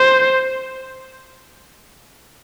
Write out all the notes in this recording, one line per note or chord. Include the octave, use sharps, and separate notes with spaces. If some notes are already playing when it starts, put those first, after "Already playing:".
Already playing: C5